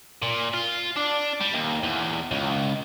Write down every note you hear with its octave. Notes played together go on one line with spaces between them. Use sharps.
A#2
F4
D4
G3
D#2
E2
C#2